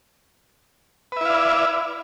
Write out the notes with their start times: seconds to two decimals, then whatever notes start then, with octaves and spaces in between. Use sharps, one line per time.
1.12 B4
1.17 E5
1.21 E4
1.25 F5
1.30 D5